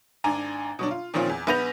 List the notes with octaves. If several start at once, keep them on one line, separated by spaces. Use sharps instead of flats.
G#1 D4 G#5 A#5
B2 F#3 D4
F4
A#2 D#3 F3 C4 C#4 F4
E2
A#1 B3 B4 G6 A#6 F7